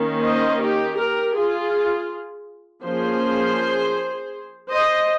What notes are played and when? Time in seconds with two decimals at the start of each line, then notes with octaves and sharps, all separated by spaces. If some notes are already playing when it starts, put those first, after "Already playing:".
Already playing: D#3 A#3 C#4
0.22 C5 D#5
0.59 D#4 G4
0.96 G4 A#4
1.34 F4 G#4
2.83 F3 A#3 C#4 G#4 C5
4.70 C5 D#5